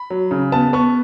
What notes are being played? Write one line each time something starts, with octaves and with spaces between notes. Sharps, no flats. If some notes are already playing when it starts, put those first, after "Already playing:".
Already playing: B5
F#3
C#3
B3 A5
B3 C#6